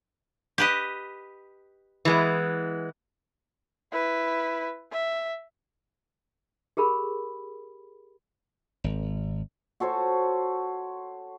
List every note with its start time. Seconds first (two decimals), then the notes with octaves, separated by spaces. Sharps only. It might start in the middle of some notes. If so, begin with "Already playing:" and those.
0.58 G4 B4 D#5
2.05 E3 G#3 B3
3.92 E4 B4
4.92 E5
6.77 G4 G#4 A#4 B5
8.84 G#1
9.80 F#4 A4 C5 C#5